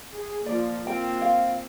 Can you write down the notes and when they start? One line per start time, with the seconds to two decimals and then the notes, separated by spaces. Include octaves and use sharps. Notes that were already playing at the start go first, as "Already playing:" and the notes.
0.13 G#4
0.46 F3 A#3 D5
0.87 A#3 C4 F4 G5
1.22 F5